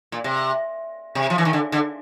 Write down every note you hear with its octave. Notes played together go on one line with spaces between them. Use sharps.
A#2
C3
C3
F3
E3
D#3
D3
D3